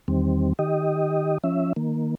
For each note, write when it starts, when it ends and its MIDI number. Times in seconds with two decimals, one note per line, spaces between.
0.08 0.53 40
0.08 0.53 51
0.08 0.53 55
0.08 0.53 60
0.59 1.38 51
0.59 1.38 67
0.59 1.38 75
1.44 1.73 53
1.44 1.73 61
1.44 1.73 76
1.76 2.15 51
1.76 2.15 58